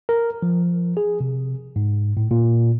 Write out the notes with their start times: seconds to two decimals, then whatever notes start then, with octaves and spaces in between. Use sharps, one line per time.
0.09 A#4
0.42 F3
0.97 G#4
1.20 C3
1.76 G#2
2.17 A2
2.31 A#2